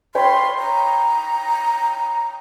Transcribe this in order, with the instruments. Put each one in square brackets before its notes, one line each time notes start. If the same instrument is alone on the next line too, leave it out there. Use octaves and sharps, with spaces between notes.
[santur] C#5 G5 B5 [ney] C6
[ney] A#5